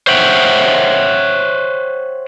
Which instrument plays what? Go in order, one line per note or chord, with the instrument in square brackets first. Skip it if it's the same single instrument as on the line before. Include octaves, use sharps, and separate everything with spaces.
[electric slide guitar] C5 C#5 E5 F#5 G5